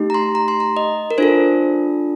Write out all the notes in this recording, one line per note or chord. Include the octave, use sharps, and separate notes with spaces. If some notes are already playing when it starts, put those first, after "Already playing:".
Already playing: A3 D#4 G4
A#5
C6
A#5
C6
A#5
D#5
A#4
D4 F4 A4 C5